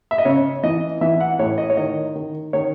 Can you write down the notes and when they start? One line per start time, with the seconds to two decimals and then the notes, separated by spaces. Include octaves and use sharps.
0.11 E5
0.18 D#5
0.25 C#3 C#5
0.63 E3 D#5
1.01 E3 E5
1.20 F#5
1.39 A2 C#5
1.58 D#5
1.70 C#5
1.77 D#3 D#5
2.15 D#3
2.53 D#3 C#5